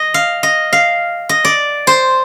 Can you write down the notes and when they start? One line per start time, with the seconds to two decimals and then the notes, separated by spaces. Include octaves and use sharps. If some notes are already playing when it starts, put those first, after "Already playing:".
Already playing: D#5
0.14 F5
0.43 D#5
0.73 F5
1.29 D#5
1.45 D5
1.87 C5